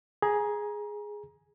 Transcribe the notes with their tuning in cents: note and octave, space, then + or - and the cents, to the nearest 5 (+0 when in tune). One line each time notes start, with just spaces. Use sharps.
G#4 +0 A#5 +25